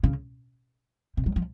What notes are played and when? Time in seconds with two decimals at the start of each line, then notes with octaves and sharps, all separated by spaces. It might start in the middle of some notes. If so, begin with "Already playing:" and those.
0.03 C#3
1.17 C3
1.26 F#3
1.36 F3